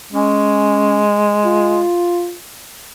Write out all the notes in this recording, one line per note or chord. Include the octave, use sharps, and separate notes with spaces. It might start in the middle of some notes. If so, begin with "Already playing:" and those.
G#3 C#4
F4